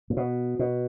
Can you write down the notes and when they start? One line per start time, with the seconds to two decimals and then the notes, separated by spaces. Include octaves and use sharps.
0.10 A#2
0.17 B2
0.59 B2